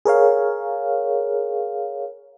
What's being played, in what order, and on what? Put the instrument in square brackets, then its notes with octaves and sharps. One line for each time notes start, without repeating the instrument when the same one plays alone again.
[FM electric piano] G#4 A#4 C#5 F5